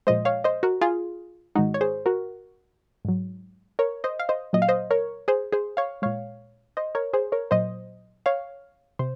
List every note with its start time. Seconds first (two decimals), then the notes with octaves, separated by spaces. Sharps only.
0.07 A#2 F3 G#3 C5 D#5
0.25 C#5 F5
0.44 C5 D#5
0.63 F#4 A#4
0.81 F4 G#4
1.55 G#2 D#3 G#3 D#4 F#4
1.74 C#5
1.81 G#4 C5
2.06 F#4 A#4
3.05 G#2 F#3
3.79 A#4 C#5
4.04 C5 D#5
4.19 F5
4.29 C5 D#5
4.53 A#2 F#3 D#5
4.62 F5
4.69 C5 D#5
4.91 A#4 C#5
5.28 G#4 C5
5.52 G#4 C5
5.77 C#5 F5
6.02 A#2 G#3 C#5 F5
6.77 C5 D#5
6.95 A#4 C#5
7.13 G#4 C5
7.32 A#4 C#5
7.51 A#2 F#3 C5 D#5
8.26 C#5 F5
8.99 C3 C5